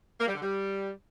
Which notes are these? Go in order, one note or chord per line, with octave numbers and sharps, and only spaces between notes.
A#3
G3
D3
G3